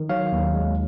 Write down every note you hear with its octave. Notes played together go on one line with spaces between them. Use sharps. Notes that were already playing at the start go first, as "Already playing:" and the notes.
Already playing: D#3
F#3 C#5 F5
D#2
G#3